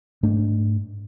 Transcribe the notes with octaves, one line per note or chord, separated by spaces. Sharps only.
G#2 A3 D4